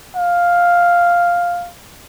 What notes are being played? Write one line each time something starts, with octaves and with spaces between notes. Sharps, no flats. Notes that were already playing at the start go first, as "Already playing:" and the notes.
F5